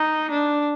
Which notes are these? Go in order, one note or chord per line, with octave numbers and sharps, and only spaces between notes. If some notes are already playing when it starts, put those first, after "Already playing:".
Already playing: D#4
D4